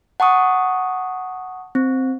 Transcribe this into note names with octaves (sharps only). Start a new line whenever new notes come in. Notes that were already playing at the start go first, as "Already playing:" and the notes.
F#5 A5 C#6 D#6
C4